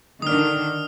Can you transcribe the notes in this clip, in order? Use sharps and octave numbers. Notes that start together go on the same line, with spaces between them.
D3 D#3 D4 D#6 F6